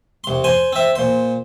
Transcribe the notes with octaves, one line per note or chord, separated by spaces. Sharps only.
C2 C6
C5 G#5 C6
C4 E5
A#2 C5